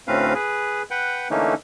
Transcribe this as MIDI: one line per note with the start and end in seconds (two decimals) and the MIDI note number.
0.08 0.34 38
0.08 0.34 45
0.08 0.34 60
0.08 0.34 61
0.08 0.34 71
0.08 0.34 77
0.34 0.82 68
0.34 0.82 71
0.91 1.28 71
0.91 1.28 78
0.91 1.28 79
1.30 1.54 50
1.30 1.54 52
1.30 1.54 57
1.30 1.54 58
1.30 1.54 61
1.30 1.54 63